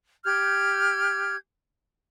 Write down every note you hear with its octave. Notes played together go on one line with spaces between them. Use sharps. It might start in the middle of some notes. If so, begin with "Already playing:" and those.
G4 F6 G6 G#6